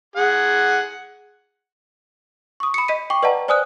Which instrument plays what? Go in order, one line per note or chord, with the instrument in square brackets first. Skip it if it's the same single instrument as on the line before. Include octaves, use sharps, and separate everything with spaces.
[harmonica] G#4 F#5
[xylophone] C#6 D#6
B5 C#7
D#5 B6 D#7
G5 C#6 D6
B4 D5 D#5 F#5 A5 A#5
C5 D5 G#5 D#6 F6 F#6